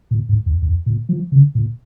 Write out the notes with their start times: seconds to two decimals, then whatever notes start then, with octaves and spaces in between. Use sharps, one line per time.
0.11 A#2
0.29 G#2
0.46 F2
0.62 F2
0.86 A#2
1.09 F3
1.32 C#3
1.55 A#2